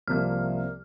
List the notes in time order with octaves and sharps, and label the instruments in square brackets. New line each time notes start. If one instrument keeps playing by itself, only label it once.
[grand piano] C2 C3 F3 A#3 [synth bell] F6